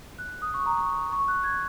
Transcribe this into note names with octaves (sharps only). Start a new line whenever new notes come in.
F#6
D#6
C#6
A#5
C#6
C#6
F#6
G#6